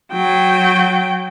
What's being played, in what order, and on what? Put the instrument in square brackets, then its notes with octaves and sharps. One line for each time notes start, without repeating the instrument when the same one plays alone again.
[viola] F#3 G5